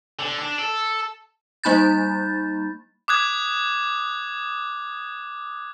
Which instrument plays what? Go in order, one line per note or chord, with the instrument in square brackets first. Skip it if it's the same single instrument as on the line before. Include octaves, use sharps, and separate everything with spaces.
[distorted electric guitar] D3
D4
A4
[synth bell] G3 A#3 D#4 B5 G6 A6
[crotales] D6 D#6 F#6 G#6